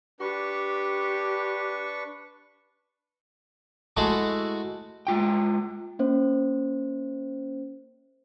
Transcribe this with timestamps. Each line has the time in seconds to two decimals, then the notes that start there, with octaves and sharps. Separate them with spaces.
0.20 D4 G4 B4 C#6
3.97 G#3 A3 E4 F#4 G#4 A4
5.07 G#3 F4 G5
5.99 A#3 C#4 C5